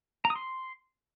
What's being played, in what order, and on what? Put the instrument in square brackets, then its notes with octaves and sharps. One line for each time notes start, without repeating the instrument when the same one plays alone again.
[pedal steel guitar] A#5
D#6
C6